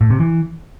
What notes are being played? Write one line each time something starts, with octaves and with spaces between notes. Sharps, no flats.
A2
C3
E3